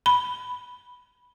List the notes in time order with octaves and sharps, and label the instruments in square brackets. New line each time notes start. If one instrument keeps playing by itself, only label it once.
[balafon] B5